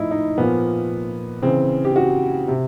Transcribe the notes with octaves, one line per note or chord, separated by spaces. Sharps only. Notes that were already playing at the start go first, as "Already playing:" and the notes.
Already playing: A2 F3 D#4 E4
D#4
A#2 F3 B3
C#3 E3 C4
G4
F#4
C3